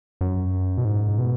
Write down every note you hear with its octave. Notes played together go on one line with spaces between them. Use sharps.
F#2
B2
G#2
B2